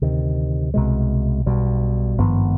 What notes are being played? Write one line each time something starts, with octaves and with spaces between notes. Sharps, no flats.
D2 C3 D#3
C2 B2 G#3
B1 B2 G3
G#1 G2 F3 B3